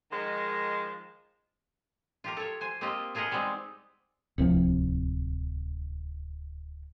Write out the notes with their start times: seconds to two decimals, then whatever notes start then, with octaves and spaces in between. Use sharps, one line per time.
0.11 D#3 F3 G#3
2.24 F4 G4 A#4
2.37 A4 C#5
2.61 C5 G#5
2.81 A#3 C4 F4 G4 D#5
3.15 F4 G#4 A#4 B4 D#5 F#5
3.31 G3 G#3 B3 C4 D#4
4.38 D1 C2 C3 F3